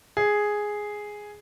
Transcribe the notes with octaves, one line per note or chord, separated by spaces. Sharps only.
G#4